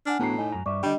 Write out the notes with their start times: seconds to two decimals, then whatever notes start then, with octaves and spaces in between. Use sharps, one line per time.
0.06 D4 F#5 G#5 F6
0.19 A2 B3 D4 F#4 A5 A#5 C7
0.38 A3 D#4 D#5 G#5
0.52 F#2 A#5
0.66 G2 D5 E5 C#6 D6
0.83 D3 G3 D4 D#5 G5